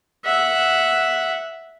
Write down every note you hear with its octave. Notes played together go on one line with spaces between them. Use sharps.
E5 F#5